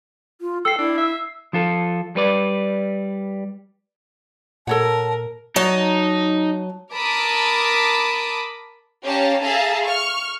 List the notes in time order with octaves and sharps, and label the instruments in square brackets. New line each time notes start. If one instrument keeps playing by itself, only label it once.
[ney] F4
[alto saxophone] A4 [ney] G5 [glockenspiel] E6 C7
[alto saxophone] D4 [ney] E4
[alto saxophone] E5
[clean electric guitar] F3 F4 A4
G3 B4 D5
[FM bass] A#2 [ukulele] A4 C#5 F#5 [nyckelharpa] A#4 [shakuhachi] A5
[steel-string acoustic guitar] F#3 A5 [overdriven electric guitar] D#4
[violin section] A#4 A5 B5 D6 D#6
C#4 G4 C#5 F5 A5 A#5
G#4 A4 E5 F5 A5 A#5
C#6 F6